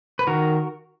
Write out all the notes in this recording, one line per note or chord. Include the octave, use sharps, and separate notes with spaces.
B4
D#3 F#4 A#4